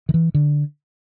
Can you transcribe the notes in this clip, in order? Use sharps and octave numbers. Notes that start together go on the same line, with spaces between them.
D#3
E3
D3